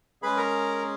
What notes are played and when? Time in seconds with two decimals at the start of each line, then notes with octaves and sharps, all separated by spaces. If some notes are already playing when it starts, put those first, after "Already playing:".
0.22 G#3 C#4 G#4 B4 B5
0.37 A#4 A#5